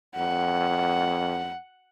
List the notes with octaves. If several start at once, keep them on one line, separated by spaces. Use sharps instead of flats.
F2 F#5